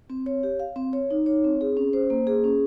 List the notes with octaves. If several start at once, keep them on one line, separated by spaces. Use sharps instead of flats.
C4
C#5
G4
F5
C4
C#5
D#4
C#5
C4
G#4
C#4
C5
A#3
G#4
C#4